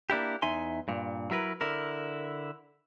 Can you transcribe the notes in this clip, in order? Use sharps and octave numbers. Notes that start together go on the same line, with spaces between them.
A#3 D4 E4 G4
E2 D#4 E5 G#5 C6
G2 A#2
F#3 E4 A#4 B4
D3 E4 A#4